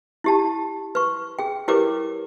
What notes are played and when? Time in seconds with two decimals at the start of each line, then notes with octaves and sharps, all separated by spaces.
0.24 E4 G4 A5
0.95 B4 C#6
1.39 G#4 G5
1.68 E4 G4 A#4 B4 C#5 D6